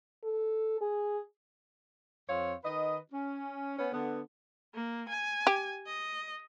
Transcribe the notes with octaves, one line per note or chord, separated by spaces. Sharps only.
A4
G#4
F2 C4 C#5 F5
D#3 B4 D#5
C#4
B3 C#4
D3 B3
A#3
G#5
G4
D#5